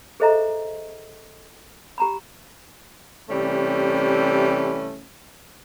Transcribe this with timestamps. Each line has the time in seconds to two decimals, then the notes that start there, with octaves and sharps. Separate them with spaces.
0.20 G#4 A4 C5 D#5 E5 A#5
1.98 G4 A#5 B5
3.29 C3 E3 G3 A3 C#4